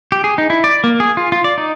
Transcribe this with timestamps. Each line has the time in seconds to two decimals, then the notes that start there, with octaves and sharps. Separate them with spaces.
0.12 G4
0.24 G#4
0.38 D#4
0.50 E4
0.64 D5
0.84 A#3
1.00 G#4
1.17 F4
1.32 F4
1.44 D5
1.58 D#4